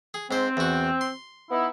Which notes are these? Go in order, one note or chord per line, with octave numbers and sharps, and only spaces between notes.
G#4
G#2 C4 C5
E2 F#4
C6
B3 D#4 E4